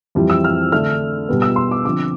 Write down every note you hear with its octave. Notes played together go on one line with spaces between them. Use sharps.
F2 E3 G3 C4
E6
F6
D3 A3 D4 F6
B2 G3 B3
E6
C6
D6
D3 F3 C4 D6